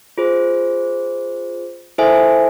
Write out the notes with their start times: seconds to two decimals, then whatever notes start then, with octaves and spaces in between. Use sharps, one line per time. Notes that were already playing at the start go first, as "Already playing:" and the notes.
0.18 F4 G#4 C5
1.98 E4 A4 C5 E5 G#5